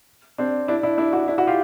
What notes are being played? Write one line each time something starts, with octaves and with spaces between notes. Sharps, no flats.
C4 D4
D4 E4
D4 E4
D4 E4
E4 F#4
D4 E4
E4 F#4
F4 G4